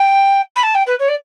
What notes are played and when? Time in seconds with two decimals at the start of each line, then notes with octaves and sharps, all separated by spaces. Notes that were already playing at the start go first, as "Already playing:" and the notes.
Already playing: G5
0.55 B5
0.62 A5
0.74 G5
0.86 B4
0.99 C#5
1.08 D5